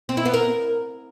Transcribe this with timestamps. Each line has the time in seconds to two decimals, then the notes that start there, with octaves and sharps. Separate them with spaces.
0.09 C4
0.17 E4
0.25 B3
0.34 A#4